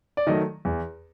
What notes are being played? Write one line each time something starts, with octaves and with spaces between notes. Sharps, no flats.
D5
D#3 F#3 A3 D#5
E2